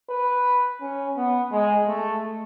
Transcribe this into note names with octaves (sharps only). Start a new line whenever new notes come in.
B4
C#4
B3
G#3
A3